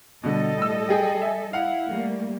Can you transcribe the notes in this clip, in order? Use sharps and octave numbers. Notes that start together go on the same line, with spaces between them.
B2 D3 G3 A4 D#5
A2 E6
G4 G#4 G5
E5 G#5
E4 F5 F#5
G3 A3 A#3